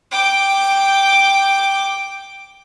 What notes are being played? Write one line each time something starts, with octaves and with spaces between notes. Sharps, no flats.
G5 D6